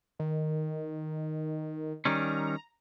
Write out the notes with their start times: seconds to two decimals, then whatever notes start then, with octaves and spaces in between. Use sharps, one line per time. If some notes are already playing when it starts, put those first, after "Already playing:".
0.19 D#3
2.05 D#3 G3 C#4 A#5